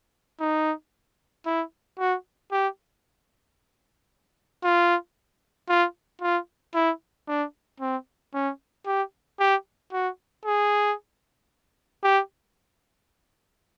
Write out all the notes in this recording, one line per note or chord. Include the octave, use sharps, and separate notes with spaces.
D#4
E4
F#4
G4
F4
F4
F4
E4
D4
C4
C#4
G4
G4
F#4
G#4
G4